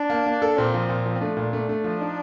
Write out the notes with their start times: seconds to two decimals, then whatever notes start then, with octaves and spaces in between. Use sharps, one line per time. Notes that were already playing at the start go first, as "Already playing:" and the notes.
Already playing: D4
0.10 A#3
0.26 A#3
0.42 A4
0.58 A#2 C4
0.74 F3
0.89 A#2
1.06 F3
1.15 C4
1.21 A3 D4
1.37 A#2
1.53 A3
1.69 A3
1.84 F3
2.01 D#4